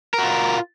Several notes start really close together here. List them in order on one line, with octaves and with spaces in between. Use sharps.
A#4 F#4 F4